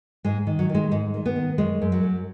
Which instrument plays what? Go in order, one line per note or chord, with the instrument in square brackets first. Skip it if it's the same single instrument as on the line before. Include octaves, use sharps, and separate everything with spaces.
[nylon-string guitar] G#2 G#3
D#3
F#3
D#3
G#3
G#2 G#3
D#3
B3
D#3
F#2 G#3
F#2
F#3
F#2